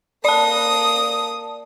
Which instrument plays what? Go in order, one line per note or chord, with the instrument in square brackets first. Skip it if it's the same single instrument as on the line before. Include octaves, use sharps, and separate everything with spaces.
[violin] A#3 D#6 [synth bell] D5 A5